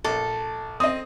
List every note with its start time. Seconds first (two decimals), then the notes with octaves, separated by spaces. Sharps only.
0.04 A#1 A4
0.80 C4 D#5 D#6